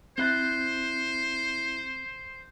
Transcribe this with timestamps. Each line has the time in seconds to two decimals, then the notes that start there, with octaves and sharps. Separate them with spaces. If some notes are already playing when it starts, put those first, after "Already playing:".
0.18 C4 E4 C5 F#6 G6 A6